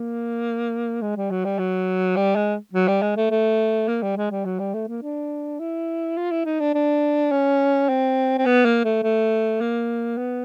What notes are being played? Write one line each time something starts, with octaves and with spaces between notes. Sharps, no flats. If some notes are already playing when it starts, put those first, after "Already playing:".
Already playing: A#3
G#3
G3
F#3
G3
F#3
G3
G#3
F#3
G3
G#3
A3
A3
A#3
G3
G#3
G3
F#3
G3
A3
A#3
D4
E4
F4
E4
D#4
D4
D4
C#4
C4
C4
B3
A#3
A3
A3
A#3
B3